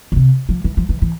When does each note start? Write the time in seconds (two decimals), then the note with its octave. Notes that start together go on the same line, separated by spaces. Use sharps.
0.12 D3
0.16 C3
0.49 F3
0.64 E3
0.77 F3
0.89 E3
1.02 E3